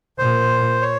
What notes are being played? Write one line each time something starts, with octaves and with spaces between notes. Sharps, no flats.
A#2 C5
C#5